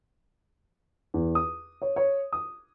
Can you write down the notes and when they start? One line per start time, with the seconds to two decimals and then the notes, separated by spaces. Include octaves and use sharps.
1.14 E2
1.35 D#6
1.82 C#5
1.96 C#5
2.33 D#6